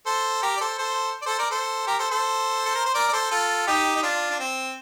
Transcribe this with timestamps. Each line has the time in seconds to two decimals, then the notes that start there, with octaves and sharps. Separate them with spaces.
0.06 A4 C5
0.42 G4 A#4
0.57 D5
0.61 A4 C5
0.79 A4 C5
1.22 D5
1.26 A4 C5
1.39 A#4 D5
1.51 A4 C5
1.87 G4 A#4
1.99 A4 C5
2.11 A4 C5
2.66 A4
2.75 A#4
2.86 C5
2.95 A#4 D5
3.08 D5
3.13 A4 C5
3.31 F4 A4
3.67 D#4 G4
3.96 D#4
4.03 D4 F4
4.31 D4
4.39 C4